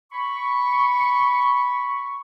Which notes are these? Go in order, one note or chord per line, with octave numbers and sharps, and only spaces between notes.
B5 C#6